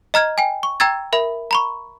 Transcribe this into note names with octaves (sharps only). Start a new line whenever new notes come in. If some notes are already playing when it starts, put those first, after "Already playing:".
D#5 A#5 F6 G#6
G5 G#5
C#6
G5 A#5 E6 G#6 A6
A#4 E5 B5
A#5 B5 C#6